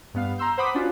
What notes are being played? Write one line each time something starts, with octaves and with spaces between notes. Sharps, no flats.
G2 B3 F5
A#5 C6 E6 G6
C5 F#5 B5 D6 D#6 B6
C#4 D4 F4 F#4